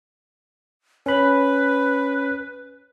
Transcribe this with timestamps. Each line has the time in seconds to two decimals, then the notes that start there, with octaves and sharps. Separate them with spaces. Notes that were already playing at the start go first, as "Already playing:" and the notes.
1.06 C#4 B4 B5